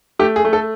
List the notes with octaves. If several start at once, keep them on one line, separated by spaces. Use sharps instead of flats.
A3 G4
G#4
A3
A4